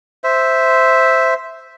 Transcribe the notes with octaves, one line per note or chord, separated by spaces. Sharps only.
C5 E5